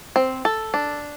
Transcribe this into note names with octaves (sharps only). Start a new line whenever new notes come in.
C4
A4
D4